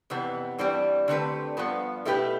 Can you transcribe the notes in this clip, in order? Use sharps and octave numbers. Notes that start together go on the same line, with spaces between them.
F2 C3 E3 B3
G2 E3 G3 C4
D3 A3 C4 G4 B4
G2 F3 B3
B2 A3 E4 G4 B4